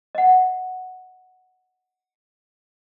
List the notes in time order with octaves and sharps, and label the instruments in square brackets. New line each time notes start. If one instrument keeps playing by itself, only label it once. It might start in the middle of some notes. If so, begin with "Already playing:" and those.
[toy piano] D#5 F#5